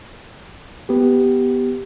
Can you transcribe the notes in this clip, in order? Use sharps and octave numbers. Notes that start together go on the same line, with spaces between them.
B3 G4